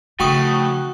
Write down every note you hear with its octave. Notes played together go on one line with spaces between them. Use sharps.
A2 C#3 F3 F#4 G5 C#6 D#6